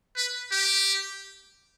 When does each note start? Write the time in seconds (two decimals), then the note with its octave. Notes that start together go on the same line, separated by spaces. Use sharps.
0.16 B4
0.51 G4